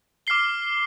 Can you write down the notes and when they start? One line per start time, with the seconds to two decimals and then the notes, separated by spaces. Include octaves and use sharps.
0.27 D6 F6 C7 G7